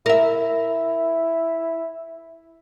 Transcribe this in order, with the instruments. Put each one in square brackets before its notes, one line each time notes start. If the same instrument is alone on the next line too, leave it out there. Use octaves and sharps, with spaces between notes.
[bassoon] E4 [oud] A#4 E5